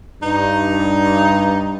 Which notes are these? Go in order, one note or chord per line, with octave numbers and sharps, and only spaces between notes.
G2 D#4